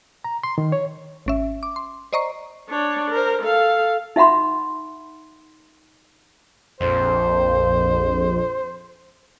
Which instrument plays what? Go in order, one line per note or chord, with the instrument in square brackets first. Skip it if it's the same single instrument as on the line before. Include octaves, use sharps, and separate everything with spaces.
[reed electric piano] A#5
C6
D#3
C#5
[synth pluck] G#1 C#4 E5
D6
C6
C5 D5 D#5 A#5 C#6 C7
[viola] D4 C#5
A#4 C5
A4 F5
[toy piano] D#4 E5 F#5 B5 C6
[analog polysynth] A#1 F2 [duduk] C5